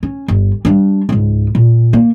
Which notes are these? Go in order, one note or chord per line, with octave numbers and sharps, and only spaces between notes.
C#4
G1
G3 D4
C#2 G#2
A#2
A#3